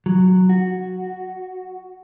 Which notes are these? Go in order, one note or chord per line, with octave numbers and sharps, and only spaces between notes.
F#3
F#4